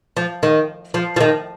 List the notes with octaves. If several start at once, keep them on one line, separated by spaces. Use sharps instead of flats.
F3
D#3
F3
F3
D#3